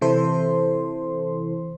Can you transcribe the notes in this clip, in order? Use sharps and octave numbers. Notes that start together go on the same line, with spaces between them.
C3 E3 E4 A4 C5 C6